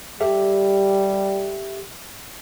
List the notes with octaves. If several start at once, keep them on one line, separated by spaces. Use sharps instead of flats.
G3 G4 A4 E5